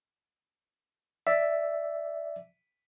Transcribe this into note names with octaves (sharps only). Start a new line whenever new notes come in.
D5 E5